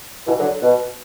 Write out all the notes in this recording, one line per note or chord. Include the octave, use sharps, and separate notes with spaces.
B2 E3
D3 F#3
B2